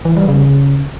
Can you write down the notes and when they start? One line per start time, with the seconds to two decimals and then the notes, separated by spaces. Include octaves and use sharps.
0.05 E3
0.17 G3
0.28 C#3